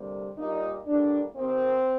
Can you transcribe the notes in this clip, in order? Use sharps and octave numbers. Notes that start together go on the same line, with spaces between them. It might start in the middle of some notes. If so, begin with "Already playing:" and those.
Already playing: D2 C3 G3 A#3
A#2 G3 A#3 D#4
A2 G3 A#3 D4
D#2 D#3 A#3 C4